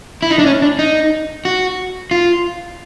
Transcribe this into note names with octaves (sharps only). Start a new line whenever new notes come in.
E4
D#4
D4
C#4
D4
D#4
F#4
F4